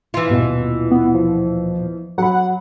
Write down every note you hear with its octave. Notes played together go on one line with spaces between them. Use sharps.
E3 F4
D#1 B2
B3
F3
F#3 F#5 B5